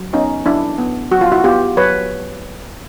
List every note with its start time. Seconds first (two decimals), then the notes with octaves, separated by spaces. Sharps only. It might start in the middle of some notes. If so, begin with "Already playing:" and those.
Already playing: F#3
0.13 B3 C#4 D#4
0.46 F#3 D4 E4
0.78 B3
1.11 F#3 F#4
1.21 F4
1.32 E4 F#4
1.44 B3 F4 G4
1.77 F#3 B4 C#5